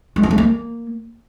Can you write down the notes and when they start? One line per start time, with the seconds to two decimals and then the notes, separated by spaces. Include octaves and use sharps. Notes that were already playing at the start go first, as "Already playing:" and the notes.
0.16 G#3
0.23 C4
0.31 A3
0.38 A#3